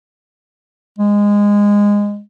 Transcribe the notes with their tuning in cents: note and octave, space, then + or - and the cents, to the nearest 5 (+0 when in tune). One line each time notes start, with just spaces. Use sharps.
G#3 -20